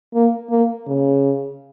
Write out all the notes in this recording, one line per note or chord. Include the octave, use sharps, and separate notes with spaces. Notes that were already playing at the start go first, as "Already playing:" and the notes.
A#3
A#3
C#3